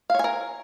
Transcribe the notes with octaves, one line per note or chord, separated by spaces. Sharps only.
A#4 C#5 F5 G#5